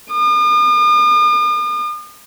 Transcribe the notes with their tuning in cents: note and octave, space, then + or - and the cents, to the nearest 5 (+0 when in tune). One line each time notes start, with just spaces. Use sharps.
D#6 -45